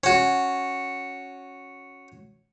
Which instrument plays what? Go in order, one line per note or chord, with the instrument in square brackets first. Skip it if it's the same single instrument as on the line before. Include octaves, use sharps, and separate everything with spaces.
[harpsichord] C#4 F#4